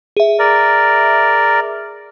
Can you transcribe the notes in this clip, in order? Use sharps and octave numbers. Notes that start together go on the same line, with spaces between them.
G#4 E5
A#4 D5